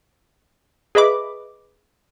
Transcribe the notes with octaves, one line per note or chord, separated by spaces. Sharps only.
G#4 B4 D#5 E5 B5 D6